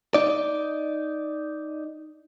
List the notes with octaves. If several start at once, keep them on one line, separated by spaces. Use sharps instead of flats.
D#4 D5